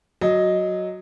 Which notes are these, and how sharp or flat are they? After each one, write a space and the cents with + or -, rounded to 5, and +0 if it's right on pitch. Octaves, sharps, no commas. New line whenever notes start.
F#3 +0 D#5 +0